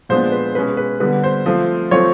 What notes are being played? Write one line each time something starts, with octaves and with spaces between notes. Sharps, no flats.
A#2 F3 G#3 B3 D4 C5
B4
B2 G#3 C#4 B4
B4
D3 G3 B3 B4
C5
F3 A3 C4
F3 A3 C4 C#5